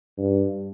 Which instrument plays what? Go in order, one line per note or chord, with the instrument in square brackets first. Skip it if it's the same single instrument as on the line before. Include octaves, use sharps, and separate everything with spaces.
[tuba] G2